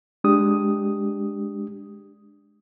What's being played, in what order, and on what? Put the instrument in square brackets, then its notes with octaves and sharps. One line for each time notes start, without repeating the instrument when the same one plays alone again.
[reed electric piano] G#3 D4 G4 D#6